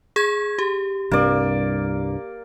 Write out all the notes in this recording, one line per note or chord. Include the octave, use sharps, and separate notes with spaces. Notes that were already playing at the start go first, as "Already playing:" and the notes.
G#4 G#6
G4
C2 G2 C3 A#3 D5